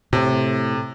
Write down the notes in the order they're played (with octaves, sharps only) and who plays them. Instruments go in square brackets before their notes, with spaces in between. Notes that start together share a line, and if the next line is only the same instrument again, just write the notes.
[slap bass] A2 [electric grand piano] C3